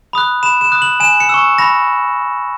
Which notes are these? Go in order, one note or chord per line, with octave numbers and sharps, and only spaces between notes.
B5 D#6 F#6
B5 E7
E7
D#6 F#6
F#7
G#5 E7
C#7
C#6 E6
B5 A#6